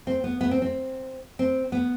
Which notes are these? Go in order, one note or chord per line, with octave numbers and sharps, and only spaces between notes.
C4
B3
B3
C4
C4
C4
B3